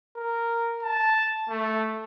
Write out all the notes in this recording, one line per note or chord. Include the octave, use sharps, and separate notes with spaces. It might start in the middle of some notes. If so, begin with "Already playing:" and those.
A#4
A5
A3